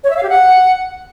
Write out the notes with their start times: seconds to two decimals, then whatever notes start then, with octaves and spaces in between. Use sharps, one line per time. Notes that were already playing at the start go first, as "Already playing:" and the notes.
0.04 C#5
0.10 E5
0.17 F5
0.23 G4
0.29 F#5